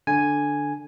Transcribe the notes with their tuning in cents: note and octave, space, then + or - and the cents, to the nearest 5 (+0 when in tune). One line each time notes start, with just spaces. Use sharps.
D3 +0 G#5 +0